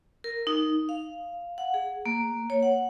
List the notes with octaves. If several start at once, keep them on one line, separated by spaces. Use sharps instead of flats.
A#4
D#4
F5
F#5
G#4
A#3
C#5
F#5